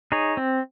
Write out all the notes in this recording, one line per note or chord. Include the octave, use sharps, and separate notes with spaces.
D#4 G#4 C#5
C4